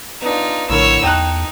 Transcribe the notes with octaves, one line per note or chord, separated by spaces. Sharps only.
B3 D4 D#4 F4
A#1 A2 D3 A#4 C#5 E6
E2 D#4 G5 A5 F#6